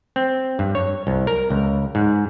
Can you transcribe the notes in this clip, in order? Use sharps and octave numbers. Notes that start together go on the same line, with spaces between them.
C4
G2
C#5
C2
A#4
C#2
G#2